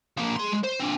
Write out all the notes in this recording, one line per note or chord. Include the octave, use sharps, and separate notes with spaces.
F3 A#3
G#4 C6
G#3
C5
C4 D4